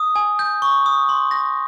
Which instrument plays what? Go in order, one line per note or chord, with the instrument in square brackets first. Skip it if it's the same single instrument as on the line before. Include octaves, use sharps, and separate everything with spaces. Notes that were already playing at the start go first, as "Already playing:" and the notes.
Already playing: [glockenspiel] D#6
G#5
G6
C#6
D#6
C6
A#6